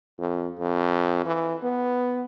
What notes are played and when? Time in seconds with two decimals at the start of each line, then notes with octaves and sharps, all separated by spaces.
0.19 F2
0.59 F2
1.26 E3
1.63 B3